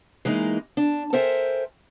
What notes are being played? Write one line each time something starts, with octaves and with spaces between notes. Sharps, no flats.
E3 G#3 A#3 D#4
D4
A4 A#4 C5 E5 G5 G#5